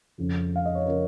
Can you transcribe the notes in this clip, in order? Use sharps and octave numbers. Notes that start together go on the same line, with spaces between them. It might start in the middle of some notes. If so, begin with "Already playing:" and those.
F2 C#3 F3
F5
D#5
C#5
C#3 F3 A#4